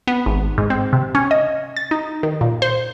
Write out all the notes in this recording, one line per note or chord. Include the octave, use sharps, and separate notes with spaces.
B3
G#1
G#2
C4
C3
C#4
D#5
A6
D#4
D#3
A#2
C5